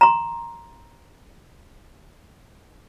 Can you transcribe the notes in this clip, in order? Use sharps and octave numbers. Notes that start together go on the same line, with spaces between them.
A#5 C6